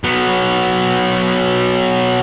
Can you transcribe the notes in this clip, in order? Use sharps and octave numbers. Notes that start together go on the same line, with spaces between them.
F#3 B3